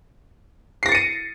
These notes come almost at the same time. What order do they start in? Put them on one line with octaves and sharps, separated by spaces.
C7 A#6 A6 C#7 D#7